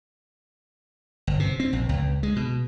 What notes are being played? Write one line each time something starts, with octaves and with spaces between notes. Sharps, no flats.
G1
C3
C4
A#1
C#2
G#3
B2